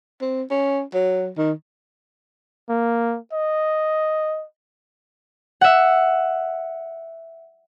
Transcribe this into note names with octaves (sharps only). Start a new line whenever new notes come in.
C4
C#4
F#3
D#3
A#3
D#5
E5 F#5